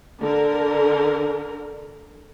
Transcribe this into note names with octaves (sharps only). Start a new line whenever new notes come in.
D3 A#4